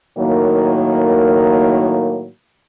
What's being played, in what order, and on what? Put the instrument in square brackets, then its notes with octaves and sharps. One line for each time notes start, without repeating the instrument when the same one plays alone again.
[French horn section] A2 D#3 F#3 A#3